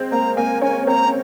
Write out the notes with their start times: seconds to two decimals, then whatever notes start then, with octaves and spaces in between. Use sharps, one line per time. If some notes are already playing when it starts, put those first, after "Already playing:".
Already playing: G#3 C4
0.12 A#3 A#5
0.36 A#3 G#5
0.62 C#4 G#5
0.87 C4 A#5